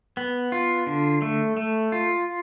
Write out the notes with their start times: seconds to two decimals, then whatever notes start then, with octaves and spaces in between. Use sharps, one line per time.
0.17 B3
0.52 F4
0.87 D3
1.22 A3
1.57 A3
1.92 F4